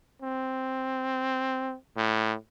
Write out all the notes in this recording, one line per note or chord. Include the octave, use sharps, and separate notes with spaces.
C4
A2